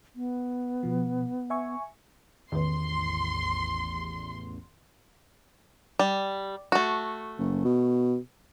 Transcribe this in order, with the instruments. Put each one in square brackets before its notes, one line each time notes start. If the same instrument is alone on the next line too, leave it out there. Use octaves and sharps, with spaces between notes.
[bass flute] B3
[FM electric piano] B2 F3
E5 G#5 C#6
[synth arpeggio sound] A1 E2 [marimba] D#3 B4 [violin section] C6
[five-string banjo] G3
A3 F#4
[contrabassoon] F#1
B2